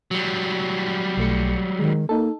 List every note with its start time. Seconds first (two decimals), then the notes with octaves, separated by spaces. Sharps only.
0.11 F#3 G3
1.17 B1 A3 C#7
1.79 D#3 G#3
2.09 A#3 D#4 A4